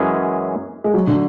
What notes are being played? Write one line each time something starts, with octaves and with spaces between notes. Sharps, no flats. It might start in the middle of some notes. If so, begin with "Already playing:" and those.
Already playing: F#2 E3 G#3 C#4 G#4
G#3
F#3
D3